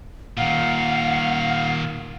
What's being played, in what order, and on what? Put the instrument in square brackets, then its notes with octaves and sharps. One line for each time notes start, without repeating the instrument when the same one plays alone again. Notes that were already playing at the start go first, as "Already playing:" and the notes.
[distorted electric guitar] A#2 D#3 [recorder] F5 [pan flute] F#5